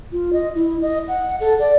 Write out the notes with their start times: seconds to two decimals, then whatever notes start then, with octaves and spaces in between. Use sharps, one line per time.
0.12 F4
0.33 D#5
0.55 E4
0.82 D#5
1.08 F#5
1.40 A4
1.60 D5